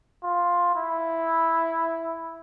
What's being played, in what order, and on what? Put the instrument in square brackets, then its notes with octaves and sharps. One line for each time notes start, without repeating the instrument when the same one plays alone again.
[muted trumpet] F4
E4